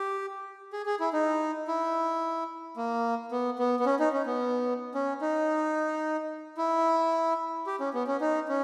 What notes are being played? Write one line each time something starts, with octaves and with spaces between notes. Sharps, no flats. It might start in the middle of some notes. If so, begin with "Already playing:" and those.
Already playing: G4
G#4
G#4
E4
D#4
E4
A#3
B3
B3
B3
C#4
D#4
C#4
B3
C#4
D#4
E4
G4
C#4
B3
C#4
D#4
C#4